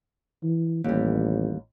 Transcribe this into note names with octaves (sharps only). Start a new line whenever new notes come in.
E3
A1 D#2 G3